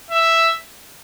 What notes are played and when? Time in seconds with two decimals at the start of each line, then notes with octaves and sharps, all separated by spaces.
0.10 E5